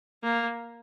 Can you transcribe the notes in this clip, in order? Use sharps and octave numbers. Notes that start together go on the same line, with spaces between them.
A#3